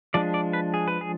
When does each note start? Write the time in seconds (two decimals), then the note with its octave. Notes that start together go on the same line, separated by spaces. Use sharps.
0.14 F3 G#3 D4 D5
0.34 D5
0.53 B4
0.74 G#4
0.88 B4
1.01 G#4